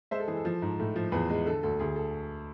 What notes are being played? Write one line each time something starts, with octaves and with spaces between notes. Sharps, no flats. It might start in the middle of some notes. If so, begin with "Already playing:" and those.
G#3 C5 E5
A4
E3 G#4
A4
F3
G#2
A2
F3
E2 G#4 B4
G#3 G#4
D3 A4
D2 A4
D2 G#4
A4